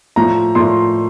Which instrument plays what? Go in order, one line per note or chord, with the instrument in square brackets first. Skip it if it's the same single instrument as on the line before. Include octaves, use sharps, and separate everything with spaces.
[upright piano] A2 F3 A#5
A2 F3 C6